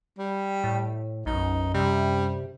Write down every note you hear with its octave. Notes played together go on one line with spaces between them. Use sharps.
G3
A2
B1 F#2 D#4
C3 G3